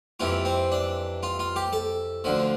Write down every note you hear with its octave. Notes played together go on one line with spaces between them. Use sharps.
F2 C3 E3 F4
C4
D4
F4
F4
G4
A4
D2 D3 F3